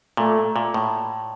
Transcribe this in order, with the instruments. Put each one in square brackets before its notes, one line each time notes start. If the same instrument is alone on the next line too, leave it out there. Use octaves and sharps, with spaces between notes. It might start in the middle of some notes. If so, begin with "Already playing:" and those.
[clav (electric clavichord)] A#2 [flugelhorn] A3
[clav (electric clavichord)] A#2
A2